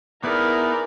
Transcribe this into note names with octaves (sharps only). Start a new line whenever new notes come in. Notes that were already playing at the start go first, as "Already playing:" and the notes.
B3 D#4 E4 G#4 A#4 D5